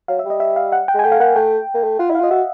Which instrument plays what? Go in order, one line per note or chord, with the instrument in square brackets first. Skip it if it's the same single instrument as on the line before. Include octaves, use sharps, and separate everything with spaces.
[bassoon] F#3 [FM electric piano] F5
[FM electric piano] E5
[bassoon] G3
[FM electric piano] D#5
E5
F5
F#5
G5
[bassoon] G#3
[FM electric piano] G#5
[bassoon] A3 [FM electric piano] G5
[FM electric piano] F5
[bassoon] A#3 [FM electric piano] F#5
[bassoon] A3 [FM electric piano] G5
[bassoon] A#3
A3
[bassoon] F4 [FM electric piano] F#5
[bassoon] E4
[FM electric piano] F5
[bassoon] F4
[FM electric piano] D#5
[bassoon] F#4 [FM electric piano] E5